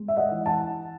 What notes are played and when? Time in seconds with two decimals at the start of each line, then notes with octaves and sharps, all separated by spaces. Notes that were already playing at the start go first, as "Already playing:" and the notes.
Already playing: G#3
0.08 E5
0.17 D#5 F#5
0.31 E3
0.46 F#5 A5